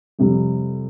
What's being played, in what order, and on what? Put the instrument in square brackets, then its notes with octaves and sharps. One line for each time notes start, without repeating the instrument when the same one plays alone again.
[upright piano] F2 C3 G3